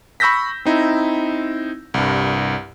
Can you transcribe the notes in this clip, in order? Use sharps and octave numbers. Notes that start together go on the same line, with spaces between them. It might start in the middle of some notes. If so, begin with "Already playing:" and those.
B5 C#6 E6 G6 A#6 B6
C4 D#4 E4
C2 G2